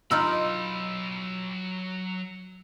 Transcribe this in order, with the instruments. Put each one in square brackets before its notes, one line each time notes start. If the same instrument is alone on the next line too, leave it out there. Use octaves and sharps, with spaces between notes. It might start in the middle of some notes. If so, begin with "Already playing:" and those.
[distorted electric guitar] F#3 B5 [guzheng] D#4 F4 A#4 [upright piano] E6